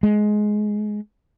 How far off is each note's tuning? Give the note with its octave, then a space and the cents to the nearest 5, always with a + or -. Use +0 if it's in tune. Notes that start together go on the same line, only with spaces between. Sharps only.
G#3 +15